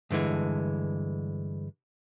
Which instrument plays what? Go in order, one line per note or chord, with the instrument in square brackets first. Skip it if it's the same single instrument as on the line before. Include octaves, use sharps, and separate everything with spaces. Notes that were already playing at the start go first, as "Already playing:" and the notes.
[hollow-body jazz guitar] G2 D3 E3 G#3